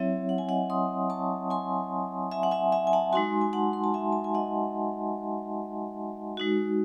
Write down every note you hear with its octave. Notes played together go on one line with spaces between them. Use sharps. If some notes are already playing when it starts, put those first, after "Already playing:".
Already playing: F#3 C4 E4 C#5 E5
F#5
G#5
D#5 F#5
C6 D#6
A5 C#6
G#5 C6
E5 G#5
F#5
E5 G#5
E5 G#5
G#5
F#5 A5
G#3 D#4 F#4 G#5 C6
G#5
F#5 A5
C6
A5
E5 G#5
A5
G#5
D#5 F#5
G#3 D#4 F#4